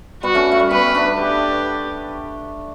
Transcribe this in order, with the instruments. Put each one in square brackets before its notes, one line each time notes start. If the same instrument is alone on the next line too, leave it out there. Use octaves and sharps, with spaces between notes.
[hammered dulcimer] G3 B3 [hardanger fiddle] F#4
[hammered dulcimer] A3 C#4
A3
G3
[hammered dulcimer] G3 B3 [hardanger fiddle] B4
[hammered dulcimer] B3 D4
[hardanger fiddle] G4